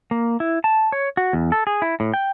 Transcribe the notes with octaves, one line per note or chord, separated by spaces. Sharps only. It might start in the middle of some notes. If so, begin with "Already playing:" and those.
A#3
E4
A5
C#5
F#4
E2
A4
G#4
E4
A2
G5